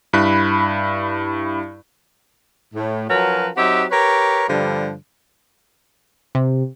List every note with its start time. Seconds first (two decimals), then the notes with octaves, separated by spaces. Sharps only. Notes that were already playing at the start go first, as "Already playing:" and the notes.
0.13 G2 E4 B5 F#6
2.74 A2
3.09 F3 F#3 C#4 F#4 A#4 B4
3.57 F#3 C4 D#4 F#4 G4 E5
3.91 G4 A#4 B4 C#5
4.48 G2 D3 F3 G3
6.35 C3